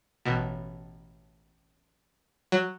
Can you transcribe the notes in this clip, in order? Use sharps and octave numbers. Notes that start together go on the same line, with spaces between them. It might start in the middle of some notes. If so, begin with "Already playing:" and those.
A1 B2
F#3